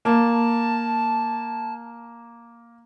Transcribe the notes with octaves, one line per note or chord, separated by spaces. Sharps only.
A#3 A5